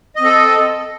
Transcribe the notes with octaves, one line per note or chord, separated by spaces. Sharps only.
C4 A4 D#5